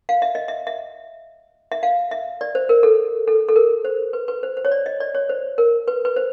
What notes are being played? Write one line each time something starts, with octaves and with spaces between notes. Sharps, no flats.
F5
E5
D#5
E5
E5
E5
F5
E5
D5
C5
A#4
A4
A4
A4
A#4
C5
B4
B4
C5
C5
C#5
D5
D#5
D5
C#5
C5
A#4
B4
B4
C5